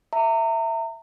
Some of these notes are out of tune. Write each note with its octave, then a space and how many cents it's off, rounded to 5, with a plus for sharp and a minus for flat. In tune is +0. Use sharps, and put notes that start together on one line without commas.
E5 +0 A#5 -35